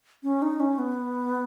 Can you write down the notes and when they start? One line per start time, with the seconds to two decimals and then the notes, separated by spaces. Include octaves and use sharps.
0.23 C#4
0.42 D#4
0.60 C#4
0.78 B3